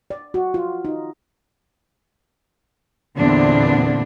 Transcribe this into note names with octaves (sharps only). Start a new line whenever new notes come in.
D5
F#4
F4
D#4
E2 A#2 D3 B3 C4 D4